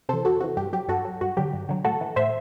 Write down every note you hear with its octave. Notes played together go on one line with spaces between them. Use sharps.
C3 E3 A4 C5
E2 F#4 A4
C3 E3 F#4
G2 G4
F#3 G4
G2 F#4 A4
F#3
G2 F#4
D3 F#3 G4
G2
D3 F#3
A2 F#4 A4
E3
A2 C5 E5